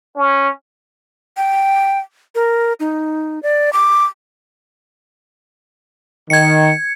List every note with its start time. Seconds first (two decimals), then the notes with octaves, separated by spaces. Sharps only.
0.17 C#4
1.37 G5
2.35 A#4
2.80 D#4
3.43 D5
3.73 D6
6.30 D#3 G#6 C#7